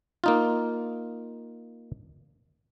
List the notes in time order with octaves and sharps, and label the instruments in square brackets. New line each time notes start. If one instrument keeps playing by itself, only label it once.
[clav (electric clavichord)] A#3 D#4 F4